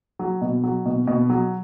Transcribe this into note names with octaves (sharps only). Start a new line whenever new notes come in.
F#3
B2
F#3
B2
B2
F#3